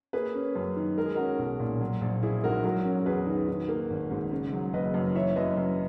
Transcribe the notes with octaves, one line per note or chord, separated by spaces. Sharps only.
A#3 G#4 B4
C#4
F#2
D#3
G#3 A#4
G#4
C#4 F#4 A#4
B1
A#2
F#3
A#1
A#1 E4 G#4
G#2 F#4 A#4
F#3 F#4 A#4
C#4
E2 G#4 B4
D#3
D#3
A#3
G#1
G#2
C#3
F#3
F#1 B4 D#5
F#2
E3 C#5 E5
F#2 B4 D#5
F#2